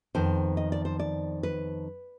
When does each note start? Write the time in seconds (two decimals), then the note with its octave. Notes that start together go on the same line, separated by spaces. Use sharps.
0.15 F2 D#3 B3 C5
0.57 D#5
0.72 D5
0.85 C5
0.99 D5
1.43 B4